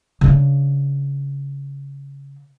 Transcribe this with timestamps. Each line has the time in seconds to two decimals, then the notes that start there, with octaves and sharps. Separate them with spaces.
0.21 C#3 D4